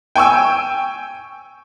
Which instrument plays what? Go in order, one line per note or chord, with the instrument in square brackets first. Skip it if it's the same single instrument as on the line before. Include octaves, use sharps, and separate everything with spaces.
[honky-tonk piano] G5 G#5 C#6 E6